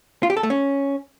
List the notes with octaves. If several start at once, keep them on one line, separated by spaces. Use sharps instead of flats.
F4
G4
A4
A3
C#4